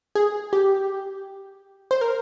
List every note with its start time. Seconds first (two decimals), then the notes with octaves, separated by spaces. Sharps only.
0.15 G#4
0.53 G4
1.91 C5
2.01 A#4